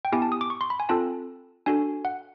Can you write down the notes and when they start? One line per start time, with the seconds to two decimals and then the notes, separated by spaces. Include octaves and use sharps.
0.05 G5
0.12 B3 E4 G4 G#5
0.22 A5
0.32 D#6
0.41 D6
0.50 C#6
0.61 C6
0.70 B5
0.80 G#5
0.89 C4 F4 A4 A5
1.66 D4 F#4 A4 G#5
2.05 F#5